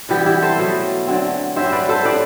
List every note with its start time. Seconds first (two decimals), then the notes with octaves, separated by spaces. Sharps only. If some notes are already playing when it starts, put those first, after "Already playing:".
0.09 C3 E3 G3 B3 E4 G4
0.26 E4 G4
0.42 A4 C5
0.58 B2 F#3 A3
1.07 D3 F#3 C4
1.56 G2 F#3 C4 C5 E5
1.72 B4 D5
1.89 A4 C5
2.05 A2 G3 C4 B4 D5